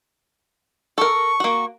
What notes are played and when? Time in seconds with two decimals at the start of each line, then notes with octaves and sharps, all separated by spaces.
0.98 A4 A#4 C#6
1.40 A#3 F#4